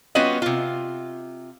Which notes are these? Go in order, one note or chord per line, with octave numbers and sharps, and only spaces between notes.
G3 B3 C#4 F4 F#4 D#5
C3 F4